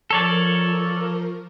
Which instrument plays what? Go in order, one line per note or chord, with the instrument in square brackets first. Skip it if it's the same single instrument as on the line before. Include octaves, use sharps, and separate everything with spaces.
[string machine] F3 A#4 [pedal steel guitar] A4 C#5 D5